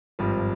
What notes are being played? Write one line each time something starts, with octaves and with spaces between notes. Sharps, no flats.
G#1 G2 F3